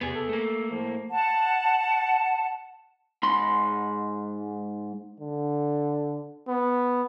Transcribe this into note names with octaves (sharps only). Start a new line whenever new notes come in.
E2 C3 B3 G#4
A4
A3 A#3
A2 F3
F#5 A5
G#2 B5 C6
D3
B3